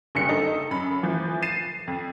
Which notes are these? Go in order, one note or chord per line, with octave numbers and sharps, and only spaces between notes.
F#1 G2 C#7
D#4 A4
F#2 B5
E3 F3
A6 C7 D#7 E7
F2